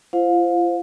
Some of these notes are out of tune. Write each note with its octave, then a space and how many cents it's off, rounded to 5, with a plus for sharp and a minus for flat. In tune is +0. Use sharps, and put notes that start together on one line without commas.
F4 -40 C5 +0 F5 +25